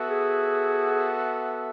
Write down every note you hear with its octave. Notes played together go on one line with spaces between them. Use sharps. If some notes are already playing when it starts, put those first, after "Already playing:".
Already playing: B3 F#4 A4 E5
G#4